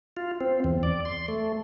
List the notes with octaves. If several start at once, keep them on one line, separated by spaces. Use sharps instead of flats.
F4
C4
E2
D5
C6
A3